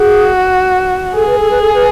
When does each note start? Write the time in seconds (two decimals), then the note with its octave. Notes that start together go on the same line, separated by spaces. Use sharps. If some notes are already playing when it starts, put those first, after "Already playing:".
Already playing: F#4 G#4
1.14 G#4 A4
1.26 B4
1.38 A4
1.50 B4
1.61 A4
1.74 B4